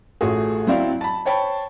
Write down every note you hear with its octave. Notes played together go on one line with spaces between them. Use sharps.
A1 A3 F4 F#4 G#4
F#3 C4 E4 D5 F5
A5 B5
C5 C#5 G5 A5 B5